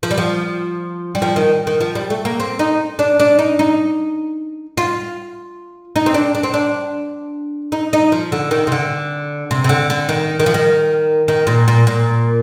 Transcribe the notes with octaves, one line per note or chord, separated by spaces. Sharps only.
F3
G3
F3
G3
F3
D#3
D#3
F3
G3
A3
A#3
C4
D#4
D4
D4
D#4
D#4
F4
D#4
C4
D4
D4
C4
D4
D#4
D#4
F3
D3
D#3
C3
D3
C3
C3
D3
D3
D#3
D#3
F3
D#3
D#3
A#2
A#2
A#2